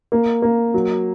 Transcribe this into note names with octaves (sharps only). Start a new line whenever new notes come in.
A#3
A#3
F#3